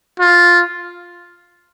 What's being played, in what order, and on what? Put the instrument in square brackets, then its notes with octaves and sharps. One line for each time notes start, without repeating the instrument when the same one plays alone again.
[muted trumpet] F4